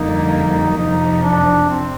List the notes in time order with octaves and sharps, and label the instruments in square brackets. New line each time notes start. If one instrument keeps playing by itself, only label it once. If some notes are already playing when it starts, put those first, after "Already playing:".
Already playing: [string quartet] F2 D3 G3 A#3 [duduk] D#4
[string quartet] F2 C3 F3 [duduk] D#4
[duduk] D4
C4